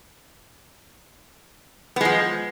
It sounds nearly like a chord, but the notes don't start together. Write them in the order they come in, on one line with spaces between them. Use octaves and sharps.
B3 G#3 F3